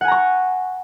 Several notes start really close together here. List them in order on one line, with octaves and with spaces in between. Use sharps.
F#5 G#5 A#5 C#6